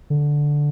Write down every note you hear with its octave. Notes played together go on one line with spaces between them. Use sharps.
D3